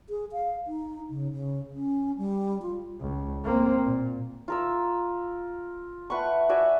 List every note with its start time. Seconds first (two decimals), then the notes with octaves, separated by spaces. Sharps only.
0.09 G#4
0.32 F5
0.67 D#4
1.10 C#3
1.32 C#3
1.74 C#4
2.18 G3
2.62 F4
3.00 C#2
3.44 A#3 C4
3.85 A#2
4.48 F4 A#4 E6
6.10 A3 B4 F#5 C#6
6.49 F#4 D5 E5 G#5